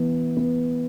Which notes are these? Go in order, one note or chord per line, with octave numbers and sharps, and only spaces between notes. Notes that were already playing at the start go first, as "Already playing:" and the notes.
Already playing: E3 B3
B3